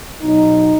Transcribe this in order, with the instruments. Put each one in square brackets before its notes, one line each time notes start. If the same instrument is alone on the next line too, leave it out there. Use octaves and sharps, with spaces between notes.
[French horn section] B2 F#3 D#4